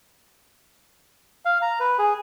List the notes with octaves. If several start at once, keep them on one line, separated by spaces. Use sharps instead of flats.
F5
A#5
B4
G#4